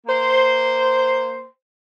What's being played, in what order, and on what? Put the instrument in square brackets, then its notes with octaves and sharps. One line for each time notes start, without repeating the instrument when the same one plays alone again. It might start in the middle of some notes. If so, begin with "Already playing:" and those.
[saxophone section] A#3 C5